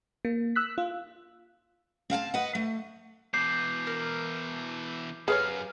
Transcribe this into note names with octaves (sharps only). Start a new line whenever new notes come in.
A#3
E6 F#6 B6
F4
C4 F5 F#5 A5
B4 D#5 F#5
A3
B2 E3 D6 G6 C7
A#4
F#2 G#4 B4 C#5 F5